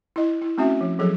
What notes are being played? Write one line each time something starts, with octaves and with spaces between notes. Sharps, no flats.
E4 D#5
E4
A3 C4 C#4 F#4 E5
F3
F3 F#3 G#4 A4